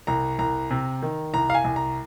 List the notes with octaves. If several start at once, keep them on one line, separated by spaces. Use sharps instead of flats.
C2 A#5
C2 A#5
C3
D#3
C2 A#5
F5
G#5
C2
A#5